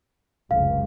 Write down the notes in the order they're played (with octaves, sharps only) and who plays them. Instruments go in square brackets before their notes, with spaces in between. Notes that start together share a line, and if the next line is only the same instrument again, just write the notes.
[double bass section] F1 C#2 F#2 [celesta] F5